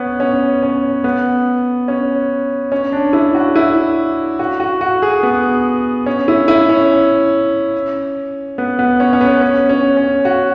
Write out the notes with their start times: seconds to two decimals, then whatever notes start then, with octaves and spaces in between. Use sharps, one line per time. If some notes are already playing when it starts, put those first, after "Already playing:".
Already playing: B3 C#4
0.20 C#4
0.63 C#4
1.04 B3
1.88 C#4
2.72 C#4
2.92 D4
3.13 E4
3.34 F#4
3.56 E4
4.39 F#4
4.60 F#4
4.81 F#4
5.02 G#4
5.23 B3
6.06 C#4
6.28 E4
6.48 E4
6.69 C#4
8.58 B3
8.79 B3
9.00 C#4
9.13 C#4
9.21 B3
9.41 C#4
9.69 C#4
9.97 C#4
10.25 F#4